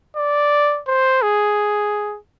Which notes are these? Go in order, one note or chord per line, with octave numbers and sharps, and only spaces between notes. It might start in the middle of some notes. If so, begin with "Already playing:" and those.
D5
C5
G#4